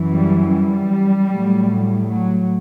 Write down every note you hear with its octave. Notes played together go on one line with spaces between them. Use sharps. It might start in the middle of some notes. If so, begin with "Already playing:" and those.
Already playing: F#2 E3
G3
G3
A2 F#3
F#3